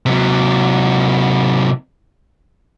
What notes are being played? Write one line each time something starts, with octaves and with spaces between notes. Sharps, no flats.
C3 F#3